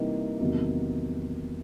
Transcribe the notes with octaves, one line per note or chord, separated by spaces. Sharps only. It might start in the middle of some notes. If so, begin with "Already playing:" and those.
Already playing: C3 E3 G3 A#3 D#4
E2 C3 D#3 F#3 A#3